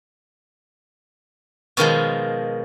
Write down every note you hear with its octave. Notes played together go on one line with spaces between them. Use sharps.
B2 D#3 F3 G#3